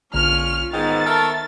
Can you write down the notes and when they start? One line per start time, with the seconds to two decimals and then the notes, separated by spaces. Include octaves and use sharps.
0.13 A#1 D3 A#3 C#4 F4 F6
0.73 G#2 D#3 B3 G5 A6
1.06 A4 A#4 E5 A5 C#6